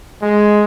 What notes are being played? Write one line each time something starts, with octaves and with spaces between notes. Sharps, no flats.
G#3